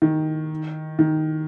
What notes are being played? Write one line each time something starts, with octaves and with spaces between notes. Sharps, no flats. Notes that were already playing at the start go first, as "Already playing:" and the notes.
D#3
D#3